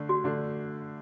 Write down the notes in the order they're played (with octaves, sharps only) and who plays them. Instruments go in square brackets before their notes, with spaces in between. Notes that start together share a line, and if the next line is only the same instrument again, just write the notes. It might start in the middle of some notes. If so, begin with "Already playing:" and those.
Already playing: [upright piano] D3 A3 D4
[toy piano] F#4
[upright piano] D3 A3 D4